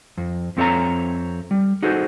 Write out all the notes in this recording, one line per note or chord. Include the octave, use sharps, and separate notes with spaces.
F2
F2 C4 A4 C#5 E5 A#5
G3
D#4 F#4 G#4 A4 C5